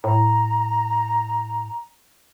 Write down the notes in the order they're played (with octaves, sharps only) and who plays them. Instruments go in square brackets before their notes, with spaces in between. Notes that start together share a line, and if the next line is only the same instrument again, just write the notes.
[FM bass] A2 [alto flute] A#5